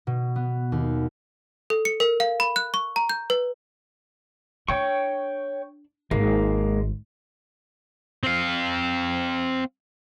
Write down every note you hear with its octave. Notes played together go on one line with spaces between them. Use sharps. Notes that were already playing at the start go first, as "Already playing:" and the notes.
B2
B3
D#2
A4
C#7
A#4
F5
B5
F#6
C#6
A#5
G6
B4
D4 C#5 G5 C#6
G#1 G#3 A#3
C4 F5